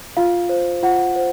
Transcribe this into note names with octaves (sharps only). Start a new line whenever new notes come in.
F4 F5
C5
F4 F#5
C5